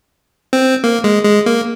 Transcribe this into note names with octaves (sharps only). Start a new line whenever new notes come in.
C4
A#3
G#3
G#3
A#3